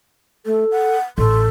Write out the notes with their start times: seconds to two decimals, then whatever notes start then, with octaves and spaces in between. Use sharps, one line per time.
0.46 A3 A4
0.71 F#5
1.18 A1 A4 C6